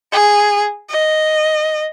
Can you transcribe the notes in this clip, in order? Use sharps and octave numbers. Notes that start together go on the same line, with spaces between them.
G#4
D#5